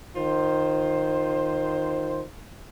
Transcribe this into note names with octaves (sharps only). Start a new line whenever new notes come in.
D#3 F4 C5